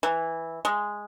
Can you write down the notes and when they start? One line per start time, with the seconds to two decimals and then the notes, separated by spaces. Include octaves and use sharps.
0.03 E3
0.65 G#3